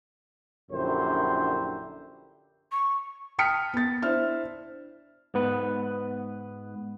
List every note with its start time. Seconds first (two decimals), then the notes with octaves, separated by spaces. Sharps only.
0.71 A#1 F#2 D3 E4 G4 C5
2.72 C#6
3.39 G5 A5 D#6 F6 B6 C#7
3.74 B3 A6
4.02 D4 E4 C5 E5 F6
5.34 G#2 B3 B4